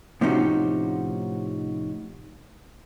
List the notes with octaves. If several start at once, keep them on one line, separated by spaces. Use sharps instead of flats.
A2 C3 F3 C#4 D#4 F#4